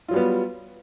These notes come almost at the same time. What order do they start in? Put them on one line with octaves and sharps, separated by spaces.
F4 F#3 G3 B3